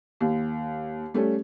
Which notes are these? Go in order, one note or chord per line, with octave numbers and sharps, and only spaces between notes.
D#2
G3 A3 C#4